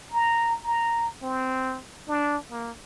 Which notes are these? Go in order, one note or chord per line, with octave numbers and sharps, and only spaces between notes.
A#5
A#5
C4
D4
A#3